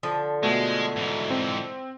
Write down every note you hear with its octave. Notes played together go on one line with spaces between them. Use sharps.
D3 F3
B2 G#3 A3
G#2 E3
C4